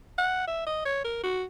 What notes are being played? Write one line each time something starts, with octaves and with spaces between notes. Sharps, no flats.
F#5
E5
D#5
C#5
A#4
F#4